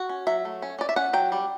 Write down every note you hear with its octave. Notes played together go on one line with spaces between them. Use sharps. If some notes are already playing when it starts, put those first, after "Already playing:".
Already playing: F#4
C#4
F#3 E5
A3
C#4
C#4 D5
E5
C#4 F#5
F#3 G5
G3